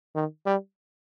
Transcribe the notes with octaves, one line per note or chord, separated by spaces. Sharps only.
D#3
G3